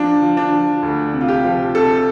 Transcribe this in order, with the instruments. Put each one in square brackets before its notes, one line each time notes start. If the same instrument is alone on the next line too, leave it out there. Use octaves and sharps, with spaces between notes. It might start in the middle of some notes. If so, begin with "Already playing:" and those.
Already playing: [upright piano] F3 D4
F3
D4
F3
D2
C3
F4
G4
F3
C3 A4